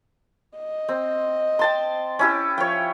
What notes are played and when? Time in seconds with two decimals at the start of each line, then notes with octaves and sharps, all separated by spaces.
0.57 D#5
0.89 C4
1.59 G5 A5 C6
2.19 C#4 E4 G4
2.58 F3 C#5 G5